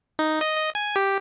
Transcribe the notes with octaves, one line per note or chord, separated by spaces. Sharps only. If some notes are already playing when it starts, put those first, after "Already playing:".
D#4
D#5
D#5
G#5
G4